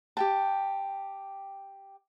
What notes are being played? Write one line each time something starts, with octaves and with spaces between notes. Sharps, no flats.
G4 G5 A5